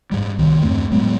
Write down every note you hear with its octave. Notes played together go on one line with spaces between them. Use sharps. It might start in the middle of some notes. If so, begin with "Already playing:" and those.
G#2 G3
C2 D#3
E2 G2 A3 C4
A2 F#3 G#3 B3